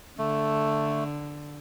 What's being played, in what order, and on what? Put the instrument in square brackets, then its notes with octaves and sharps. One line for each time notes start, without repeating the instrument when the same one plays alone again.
[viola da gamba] D3 [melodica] A3